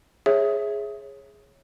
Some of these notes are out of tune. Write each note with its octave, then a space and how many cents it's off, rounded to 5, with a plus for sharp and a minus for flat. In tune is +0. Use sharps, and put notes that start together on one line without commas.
G#4 +0 C#5 -15 E5 +0